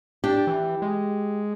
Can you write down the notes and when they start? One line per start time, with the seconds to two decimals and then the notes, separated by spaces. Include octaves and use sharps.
0.24 D4 G4
0.47 E3
0.82 G#3